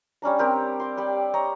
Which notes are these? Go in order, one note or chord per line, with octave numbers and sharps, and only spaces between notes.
G3 C#4 D4 A#5
C4 G4 A#4
C6 D6
G3 G4 D5
C#5 D#5 A#5